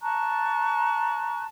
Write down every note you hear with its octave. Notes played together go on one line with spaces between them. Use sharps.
A5 A#5 C#6 F#6